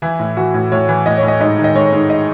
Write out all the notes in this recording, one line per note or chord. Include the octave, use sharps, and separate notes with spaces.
E3 E4
A2
E3 F#4
A2
A2 C#5
E3
A2 D#5
C#5
A2
D#5
G#2 D#5
D#3
D#5
G#2 C#5
G#2
D#5